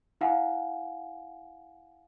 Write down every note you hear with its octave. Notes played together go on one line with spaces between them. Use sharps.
E4 F5 F#5 G#5